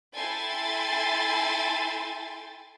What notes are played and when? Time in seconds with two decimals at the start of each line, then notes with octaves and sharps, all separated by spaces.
0.15 E4 A4 G5 G#5 C6 A6